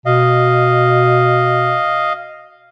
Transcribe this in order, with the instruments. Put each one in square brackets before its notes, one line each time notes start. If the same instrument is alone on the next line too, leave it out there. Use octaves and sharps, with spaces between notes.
[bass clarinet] B2 [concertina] D#5 F5